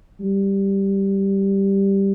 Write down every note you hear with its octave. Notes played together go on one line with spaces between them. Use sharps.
G3